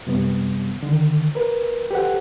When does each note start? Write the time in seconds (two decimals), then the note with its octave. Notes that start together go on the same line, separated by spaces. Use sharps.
0.07 F#2 C3 G3 B3
0.83 D3 D#3
1.35 A#4 B4
1.91 G4 A4 B4 C5 F#5